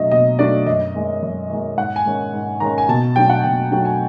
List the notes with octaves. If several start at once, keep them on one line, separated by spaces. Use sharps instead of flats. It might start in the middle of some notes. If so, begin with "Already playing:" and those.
Already playing: B2 F#3 A3 D4 D#5 E5
B2 D#5
F#3 A3 D4 D5
F#2 D#5
D#3 G#3
F#2
D#3 G#3
G#2 F#5
G#5
D#3 G#3 C#4
G#2
D#3 G#3 C#4 A#5
G#5
B2 A5
F#3 A3 D4 G5
F#5
B2 G5
F#3 A3 D4 G5
G#5